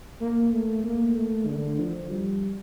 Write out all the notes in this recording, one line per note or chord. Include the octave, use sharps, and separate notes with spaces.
A#3
A3
A#3
A3
D3
F3
G3